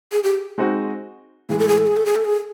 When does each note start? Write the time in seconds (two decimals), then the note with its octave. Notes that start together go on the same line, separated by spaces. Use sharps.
0.12 G#4
0.24 G4
0.58 G#3 C4 D#4 F#4
1.49 A2 E3 G#3 G#4
1.59 A4
1.68 G#4
1.78 A4
1.87 G#4
1.97 A4
2.06 G#4
2.16 A4
2.25 G#4